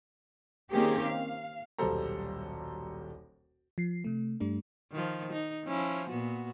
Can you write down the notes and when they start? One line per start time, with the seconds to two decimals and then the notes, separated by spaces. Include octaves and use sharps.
0.71 D#3 A#3 C4 C#4 G4 G#4
1.07 F5
1.78 D#1 B1 G3 A4 C5 A#5
3.78 F3 C7
4.04 C3 A3
4.40 G2 G3 A3 D4
4.92 D#3 F3
5.33 D#4
5.65 F3 C#4 E4
6.09 A#2 B3 F#4